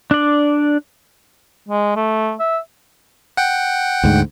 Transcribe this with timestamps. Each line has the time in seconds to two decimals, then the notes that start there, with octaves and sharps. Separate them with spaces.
0.11 D4 D5
1.68 G#3
1.96 A3
2.40 E5
3.37 F#5 G5
4.04 D2 G#2